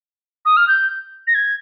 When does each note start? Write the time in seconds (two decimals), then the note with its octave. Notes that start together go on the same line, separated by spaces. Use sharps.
0.45 D#6
0.57 F6
0.68 G6
1.27 A#6
1.35 G#6